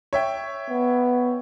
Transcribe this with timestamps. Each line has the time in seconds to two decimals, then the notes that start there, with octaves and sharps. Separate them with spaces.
0.13 C#5 E5 G5
0.69 B3